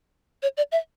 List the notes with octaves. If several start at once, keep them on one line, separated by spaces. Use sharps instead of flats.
C#5
D5
E5